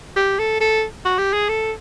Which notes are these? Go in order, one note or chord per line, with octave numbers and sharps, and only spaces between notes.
G4
A4
A4
F#4
G4
G#4
A4